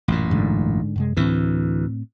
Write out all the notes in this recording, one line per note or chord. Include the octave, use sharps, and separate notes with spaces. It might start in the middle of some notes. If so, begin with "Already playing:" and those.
A1 F#2 A#2
G#2 D3
F#2 C3 G#3
D2 A2 E3 A#3 C4